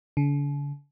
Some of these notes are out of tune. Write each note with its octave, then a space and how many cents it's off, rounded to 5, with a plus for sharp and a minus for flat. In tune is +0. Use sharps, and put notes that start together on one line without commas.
D3 -45